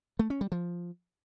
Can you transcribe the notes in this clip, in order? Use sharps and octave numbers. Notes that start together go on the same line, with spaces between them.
A3
C#4
G3
F3